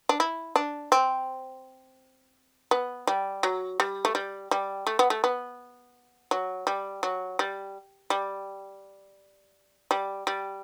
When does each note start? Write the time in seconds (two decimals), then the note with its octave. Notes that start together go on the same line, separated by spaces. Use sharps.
0.09 D4
0.20 E4
0.56 D4
0.92 C4
2.71 B3
3.07 G3
3.43 F#3
3.80 G3
4.05 A3
4.15 G3
4.51 G3
4.87 A3
4.99 B3
5.10 A3
5.24 B3
6.31 F#3
6.67 G3
7.03 F#3
7.39 G3
8.10 G3
9.91 G3
10.27 G3